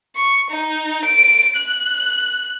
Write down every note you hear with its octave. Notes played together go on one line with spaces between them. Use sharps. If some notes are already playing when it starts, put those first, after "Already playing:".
C#6
D#4
D7
F#6